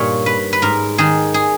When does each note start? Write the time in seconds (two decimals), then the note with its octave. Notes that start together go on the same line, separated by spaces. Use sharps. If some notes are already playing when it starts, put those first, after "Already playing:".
Already playing: G2 A#2 D#3 C#5
0.26 B4
0.53 B4
0.62 G#2 A#4
0.98 D#3 G#4
1.34 G#4